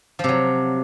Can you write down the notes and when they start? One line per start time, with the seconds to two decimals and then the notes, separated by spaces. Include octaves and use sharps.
0.19 F3
0.24 C3
0.29 F#3